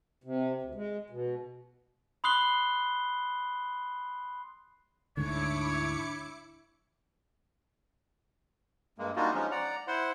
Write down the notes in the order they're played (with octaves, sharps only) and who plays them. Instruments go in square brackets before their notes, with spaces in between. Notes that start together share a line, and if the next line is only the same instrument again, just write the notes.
[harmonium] C3
D2
G#3
B2
[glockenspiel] B5 C6 D#6 F#6 C7 G7
[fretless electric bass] D2 G#2 D3 [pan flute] D4 [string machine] E4 D6 C#7 [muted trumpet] C#5
[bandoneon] G2 G#3 A#3
G3 A#3 D4 D#4 F4 F#4
F3 G#3 C#4 D#4
D5 F#5 A#5
E4 C5 F#5 C6